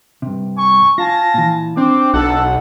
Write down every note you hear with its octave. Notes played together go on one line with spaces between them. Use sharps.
G2 C3
G#5 C#6
F4 F5 G#5 A5 A#6
A#2 E3
C4 D4 G5 D6
B1 A4 F#5